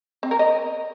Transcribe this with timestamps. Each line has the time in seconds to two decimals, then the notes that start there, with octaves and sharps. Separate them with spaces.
0.23 C4
0.31 A#4
0.39 D#5